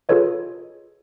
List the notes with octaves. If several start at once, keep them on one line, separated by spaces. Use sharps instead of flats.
F4 G#4 A4 B4 C#5 D#5